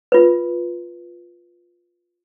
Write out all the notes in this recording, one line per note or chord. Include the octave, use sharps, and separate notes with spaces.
F4 B4